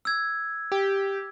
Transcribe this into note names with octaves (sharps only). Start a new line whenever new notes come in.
E6 G#6
G4